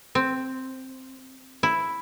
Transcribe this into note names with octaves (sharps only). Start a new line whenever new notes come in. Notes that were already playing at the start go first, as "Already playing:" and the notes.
C4
E4